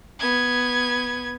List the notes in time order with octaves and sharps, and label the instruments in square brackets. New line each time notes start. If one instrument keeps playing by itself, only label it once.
[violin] B3 G#6